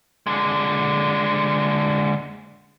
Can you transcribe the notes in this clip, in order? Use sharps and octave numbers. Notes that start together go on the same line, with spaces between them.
D3 G#3